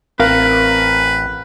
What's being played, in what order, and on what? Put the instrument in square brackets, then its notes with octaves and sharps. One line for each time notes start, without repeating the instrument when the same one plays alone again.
[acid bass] A1 [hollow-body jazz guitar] C4 F5 [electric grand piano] A#4 [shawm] B4